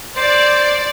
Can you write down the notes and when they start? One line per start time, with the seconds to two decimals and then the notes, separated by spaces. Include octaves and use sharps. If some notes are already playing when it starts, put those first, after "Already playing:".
0.16 C5 D5